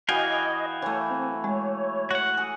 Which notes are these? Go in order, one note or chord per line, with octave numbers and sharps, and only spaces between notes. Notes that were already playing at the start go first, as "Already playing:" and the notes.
E3 F#4 D#5 F5 G5 G#5
E3 A3 C#5
C4
G#3 C#5
F#4 F#5
G#4